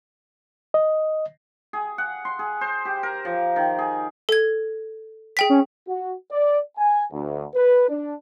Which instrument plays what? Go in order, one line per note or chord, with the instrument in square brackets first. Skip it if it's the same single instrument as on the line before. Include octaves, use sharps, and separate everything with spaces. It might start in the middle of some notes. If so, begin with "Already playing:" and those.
[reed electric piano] D#5
[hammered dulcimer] G#4
F#5
C6
G#4
C5
G4
A#4
F3
D#3
G#4
[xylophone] A4 G#6
G#4 G5 B6
[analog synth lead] C#4
[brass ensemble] F#4
D5
G#5
D2
B4
D4